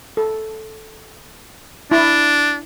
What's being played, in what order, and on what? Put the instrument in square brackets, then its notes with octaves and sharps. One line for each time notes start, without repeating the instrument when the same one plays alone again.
[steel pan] A4
[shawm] D4 [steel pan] E4